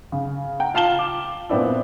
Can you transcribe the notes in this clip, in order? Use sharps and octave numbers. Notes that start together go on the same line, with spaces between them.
C#3
F#5 G5 A#5
F4 F5 A5 E7 G7
D6
A#2 B3 C4 D4 E4